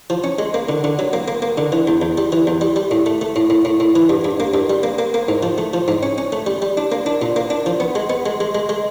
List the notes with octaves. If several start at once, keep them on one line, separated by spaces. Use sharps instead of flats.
F3
C#4
G#3
A#3
D3
D3
F#3
A#3
A#3
A#3
D3
E3
E2
E2
G3
E3
E2
G3
G3
A2
A3
A3
A2
A2
A2
A2
E3
G2
G2
A#3
G2
G3
A#3
A#3
A#3
G#2
F3
A3
F3
G#2
C#4
C#4
A3
G3
G3
D4
A#3
D4
A#2
A#3
D4
F3
B3
G#3
B3
G#3
G#3
G#3
G#3